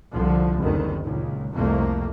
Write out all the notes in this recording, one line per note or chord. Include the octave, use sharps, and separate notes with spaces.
C2 D3 F3
F#1 D2 C3 D#3
C#2 A#2
C2 F2 C3 A3 A#3